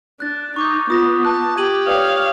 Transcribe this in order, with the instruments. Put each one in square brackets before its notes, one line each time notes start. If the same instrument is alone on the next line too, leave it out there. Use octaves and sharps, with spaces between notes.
[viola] D4 [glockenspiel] F#6 A6
[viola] D#4 [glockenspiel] C#6 D6 G6
[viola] B3 [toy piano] F4 [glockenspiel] D#6 A#6
[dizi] A5 [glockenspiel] F#6
[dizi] G4 [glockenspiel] G#6 D#7 F#7
[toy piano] B4 D5 G5 [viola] C#5 F5 [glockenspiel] D#6